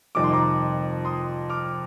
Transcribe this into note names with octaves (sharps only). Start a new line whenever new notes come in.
F2 C3 D#3 G3 D6
C6
A#5 D6
C6 D#6
D6 F6